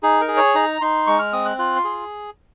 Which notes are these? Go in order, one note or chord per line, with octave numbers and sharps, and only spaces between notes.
D#4 G#4
A#4
G#4
C#5
D#4 A#5
D#4 C6
G#3 C#6
F6
C4 D#6
F#6
F4 F#6
C6
G#4